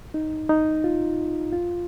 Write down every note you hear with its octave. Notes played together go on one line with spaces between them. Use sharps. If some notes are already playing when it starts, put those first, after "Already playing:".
D#4
D#4
F4
F4